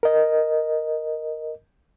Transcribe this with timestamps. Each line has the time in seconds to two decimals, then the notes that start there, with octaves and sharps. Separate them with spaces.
0.03 A#4 D#5